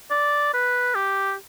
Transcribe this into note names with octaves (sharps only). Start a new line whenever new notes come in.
D5
B4
G4